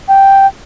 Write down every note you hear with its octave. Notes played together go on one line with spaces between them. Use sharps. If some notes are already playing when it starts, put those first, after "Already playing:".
G5